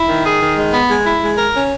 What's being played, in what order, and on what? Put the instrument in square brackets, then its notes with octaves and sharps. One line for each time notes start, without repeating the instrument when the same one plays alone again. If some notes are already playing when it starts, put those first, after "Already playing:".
Already playing: [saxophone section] E4
D#3
G#4
D#3
G#3
B3
G#3
E4
G#3
A#4
C#4